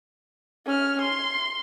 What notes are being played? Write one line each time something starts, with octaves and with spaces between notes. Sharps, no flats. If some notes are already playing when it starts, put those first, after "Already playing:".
C#4 F6
C6